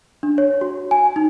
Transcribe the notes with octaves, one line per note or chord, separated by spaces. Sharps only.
D4
C#5
F#4
G#5
D#4